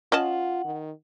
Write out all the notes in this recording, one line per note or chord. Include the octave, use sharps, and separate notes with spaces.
C#4 F4 D#5 F#5 A5
D#3